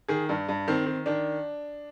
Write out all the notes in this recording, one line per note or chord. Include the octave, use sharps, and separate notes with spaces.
D#3 G#4
G2
G2
D#3 C4
D#3
D#3 D4